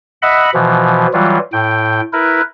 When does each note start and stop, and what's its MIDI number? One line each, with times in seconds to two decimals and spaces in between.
0.22 0.50 75
0.22 0.50 76
0.22 0.50 78
0.22 0.50 83
0.54 1.07 47
0.54 1.07 52
0.54 1.07 53
1.13 1.38 52
1.13 1.38 54
1.13 1.38 55
1.13 1.38 65
1.52 2.01 45
1.52 2.01 79
2.13 2.42 64
2.13 2.42 70
2.13 2.42 71